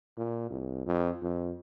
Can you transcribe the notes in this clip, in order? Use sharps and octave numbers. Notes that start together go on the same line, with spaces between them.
A#2
C2
F2
F2